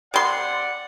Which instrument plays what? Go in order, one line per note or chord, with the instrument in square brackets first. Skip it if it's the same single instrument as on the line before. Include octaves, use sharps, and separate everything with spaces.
[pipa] C3 C6 [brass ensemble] D5 F#5